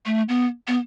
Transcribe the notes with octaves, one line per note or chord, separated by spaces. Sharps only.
A3
B3
B3